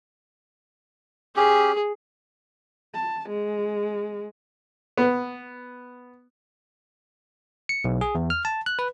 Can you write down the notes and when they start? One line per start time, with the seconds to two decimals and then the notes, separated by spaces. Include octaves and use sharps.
1.36 C#4 G4 G#4
2.94 A5
3.29 G#3
4.97 B3
7.69 C#7
7.84 B1
8.01 G#4
8.15 E2
8.30 F6
8.45 A5
8.66 F#6
8.79 B4